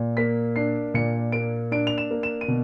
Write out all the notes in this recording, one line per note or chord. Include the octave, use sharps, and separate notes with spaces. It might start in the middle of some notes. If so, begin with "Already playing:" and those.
Already playing: A#2
A#3 B6
D4 C7
A#2 C#7
A#3 D7
D4 D7
F7
E7
A#3
E7
D#7
B2